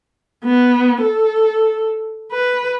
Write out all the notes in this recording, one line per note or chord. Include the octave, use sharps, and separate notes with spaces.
B3
A4
B4